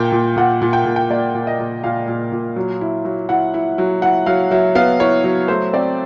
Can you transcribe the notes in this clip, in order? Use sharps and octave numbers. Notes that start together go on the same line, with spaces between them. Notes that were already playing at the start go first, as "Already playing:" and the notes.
Already playing: A#2 A#3 G5
A#2
A#2 F#5
A#2
G5
A#2
G5
A#3 D5
A#2
D#5
A#2
A#2 F5
A#2
A#2
F#3
E4
F#3
E4 F#5
E4
F#3
E4 F#5
F#3 F5
F#3 E5
B3 F5
E4 C#5
F#3
A3 C5
C4 D5